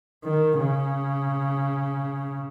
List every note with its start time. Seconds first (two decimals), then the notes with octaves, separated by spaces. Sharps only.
0.24 D#3
0.59 C#3